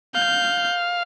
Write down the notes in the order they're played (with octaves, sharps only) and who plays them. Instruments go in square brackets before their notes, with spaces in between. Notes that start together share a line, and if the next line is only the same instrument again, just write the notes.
[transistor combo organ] F5 [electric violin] G6